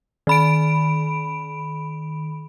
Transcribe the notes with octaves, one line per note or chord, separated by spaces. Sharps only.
D#3 B5 D7